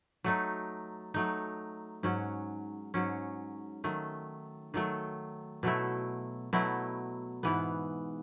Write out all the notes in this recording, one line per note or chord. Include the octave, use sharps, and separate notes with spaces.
F#3 A3 D#4
F#3 A3 D#4
G#2 F#3 C#4
G#2 F#3 C#4
D#3 F#3 A3
D#3 F#3 A3
B2 F#3 A3 E4
B2 F#3 A3 E4
G#2 E3 B3